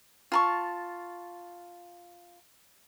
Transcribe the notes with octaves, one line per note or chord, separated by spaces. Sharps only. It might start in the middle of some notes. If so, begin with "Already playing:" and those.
F4 A5 C#6